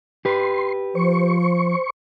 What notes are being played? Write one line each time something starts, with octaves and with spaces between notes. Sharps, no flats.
G4 B4 C6
F3 C5 C#6